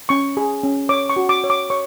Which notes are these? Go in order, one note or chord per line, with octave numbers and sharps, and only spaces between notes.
C#4 C#6
G#4
C#4
C#5 D6
C#6
F#4
D6
C#5
D6
C#5 C#6